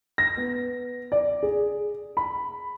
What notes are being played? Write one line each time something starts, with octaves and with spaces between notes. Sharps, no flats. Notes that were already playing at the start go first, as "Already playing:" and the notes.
A#6
B3
D5
G#4
B5